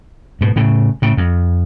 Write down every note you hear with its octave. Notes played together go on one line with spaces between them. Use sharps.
G#2 B2
A2 C#3
A2 C#3
F2